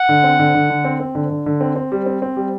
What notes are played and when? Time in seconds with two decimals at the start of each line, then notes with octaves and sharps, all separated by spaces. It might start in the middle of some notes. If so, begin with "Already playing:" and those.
Already playing: F#5
0.09 D3
0.24 C4
0.39 D3
0.55 D3
0.70 D3
0.85 C4
1.00 C4
1.15 D3
1.30 D3
1.46 D3
1.61 C4
1.76 C4
1.92 G3
2.06 C4
2.22 C4
2.37 G3